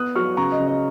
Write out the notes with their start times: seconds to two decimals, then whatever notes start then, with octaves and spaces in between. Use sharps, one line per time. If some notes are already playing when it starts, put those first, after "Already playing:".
Already playing: B3 D#6 F#6
0.16 F#3 C#6 F6
0.37 C#3 A#5 C#6
0.52 D#5
0.59 C#3
0.67 D#5